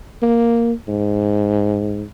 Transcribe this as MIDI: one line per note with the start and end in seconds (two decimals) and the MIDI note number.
0.22 0.73 58
0.88 2.03 44